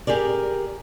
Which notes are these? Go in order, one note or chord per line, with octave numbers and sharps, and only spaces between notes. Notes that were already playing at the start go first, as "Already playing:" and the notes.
G4 G#4 A#4 D5